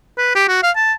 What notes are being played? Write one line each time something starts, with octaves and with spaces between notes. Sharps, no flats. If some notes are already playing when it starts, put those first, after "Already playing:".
B4
G4
F#4
F5
A5